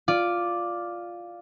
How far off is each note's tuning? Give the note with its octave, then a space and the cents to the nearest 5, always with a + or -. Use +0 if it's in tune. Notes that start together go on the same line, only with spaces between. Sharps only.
F4 +0 D5 +0